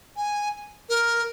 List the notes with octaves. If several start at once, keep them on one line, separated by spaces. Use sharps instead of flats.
G#5
A#4